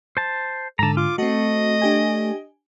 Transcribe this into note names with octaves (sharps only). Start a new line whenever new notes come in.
C5 A5
G#2 D3 A4 A5 A#5
F4 D6
A3 C4 F#4 D#5
D4 G4 G#5